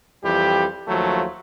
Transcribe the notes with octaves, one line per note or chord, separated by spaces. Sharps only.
F2 E3 G3 G4
D#2 F3 F#3 A3